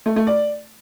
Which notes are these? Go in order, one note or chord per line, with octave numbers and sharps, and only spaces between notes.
A3
A3
D5